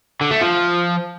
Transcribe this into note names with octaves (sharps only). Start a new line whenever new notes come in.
D3
A3
F3